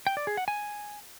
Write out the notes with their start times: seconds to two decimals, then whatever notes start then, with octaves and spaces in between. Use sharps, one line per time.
0.07 G5
0.17 D5
0.27 G#4
0.37 F#5
0.48 G#5